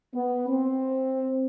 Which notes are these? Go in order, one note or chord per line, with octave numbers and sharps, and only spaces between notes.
B3
C4